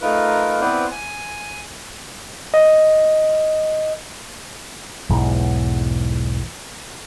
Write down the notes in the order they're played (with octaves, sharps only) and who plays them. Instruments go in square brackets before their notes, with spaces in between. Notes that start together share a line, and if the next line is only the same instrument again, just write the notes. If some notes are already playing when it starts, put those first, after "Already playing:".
[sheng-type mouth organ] A3 D#4 F4 A#4 B4
B3 C4 E4 B4 C5 D5
G#5
[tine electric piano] D#5
[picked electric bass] B1 E2 G#2